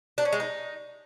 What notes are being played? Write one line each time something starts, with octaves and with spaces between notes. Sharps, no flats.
D4
C#4
G#3
D#4